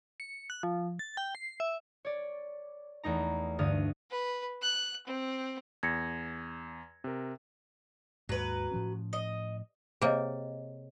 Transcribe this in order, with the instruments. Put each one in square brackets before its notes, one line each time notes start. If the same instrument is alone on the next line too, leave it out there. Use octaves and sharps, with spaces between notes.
[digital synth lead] C#7
F#6
F3
A6
G5
C7
E5
[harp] C#5 D5
E2 A3 D#4 A#5
D2 G2 D3 D#6 F6
[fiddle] B4
F#6
C4
[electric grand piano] E2 [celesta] G#6 A#6 C#7
[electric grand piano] C3 A#4
[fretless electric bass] D#2 G#2 [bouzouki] F#3 B4
[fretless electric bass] A2 F3 C#4
[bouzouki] D#5
[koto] C3 A#3 [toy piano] G#4 C#5 D#5